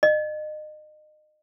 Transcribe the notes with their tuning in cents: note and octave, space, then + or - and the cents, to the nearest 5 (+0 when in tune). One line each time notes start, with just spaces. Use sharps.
D#5 -35